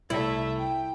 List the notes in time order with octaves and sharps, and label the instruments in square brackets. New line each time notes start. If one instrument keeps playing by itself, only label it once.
[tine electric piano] C2 [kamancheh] A3 E5 [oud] E4
[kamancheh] G5